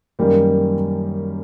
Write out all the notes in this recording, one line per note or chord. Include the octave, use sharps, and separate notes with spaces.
F#2 D#3 G3 A#3